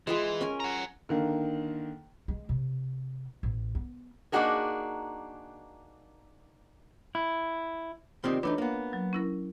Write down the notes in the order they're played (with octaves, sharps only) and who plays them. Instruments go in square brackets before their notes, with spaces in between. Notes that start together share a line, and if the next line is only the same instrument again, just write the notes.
[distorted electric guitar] E3 [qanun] G#3 F4 G#4
[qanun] C#4 A#4 G#5
[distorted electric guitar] F#5 A#5
[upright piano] D3 D#3 A#3
[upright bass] G#3
C3
A1
B3
[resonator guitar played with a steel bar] A#3 D4 D#4 F#4 G#4 A#4
[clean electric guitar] E4
[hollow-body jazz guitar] C3 D#3 C4 [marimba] F4 D5 D#6
[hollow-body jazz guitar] E3 A3 D#4 [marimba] D4 B4 C#5
[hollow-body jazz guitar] A#3 B3
[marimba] F#3
C#4 E4 A#4